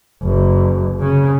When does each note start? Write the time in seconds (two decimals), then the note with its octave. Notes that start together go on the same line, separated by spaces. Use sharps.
0.22 F#1
1.00 C#3